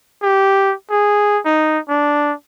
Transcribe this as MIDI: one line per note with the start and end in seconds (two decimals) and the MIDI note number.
0.22 0.74 67
0.91 1.39 68
1.45 1.79 63
1.89 2.33 62